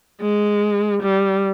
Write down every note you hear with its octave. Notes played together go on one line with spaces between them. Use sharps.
G#3
G3